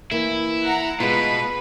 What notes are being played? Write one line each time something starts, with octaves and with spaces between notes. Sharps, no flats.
E3 A#3 E4
F#5 A#5
B2 G#3 F4 B4 B5